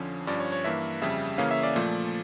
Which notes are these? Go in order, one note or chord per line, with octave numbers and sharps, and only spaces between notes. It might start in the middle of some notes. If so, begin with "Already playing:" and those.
Already playing: F2 D3 F3 C#4
G2 F3 C#4 D5
C#5
C#5
G2 E3 A#3 E5
F2 C#3 G3 E5
C#3 E3 A#3 C#4 F5
E5
D5
A#2 F3 A3